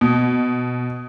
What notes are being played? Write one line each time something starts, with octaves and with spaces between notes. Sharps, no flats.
B2